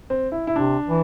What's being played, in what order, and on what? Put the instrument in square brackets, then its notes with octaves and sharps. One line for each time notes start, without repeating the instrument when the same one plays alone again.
[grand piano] C4
E4
E4
[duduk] C3 [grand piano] D4
[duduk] E3